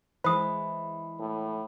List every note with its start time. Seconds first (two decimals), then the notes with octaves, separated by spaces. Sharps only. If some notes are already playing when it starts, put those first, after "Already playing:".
0.24 E3 G#3 C5 B5 D#6
1.20 A2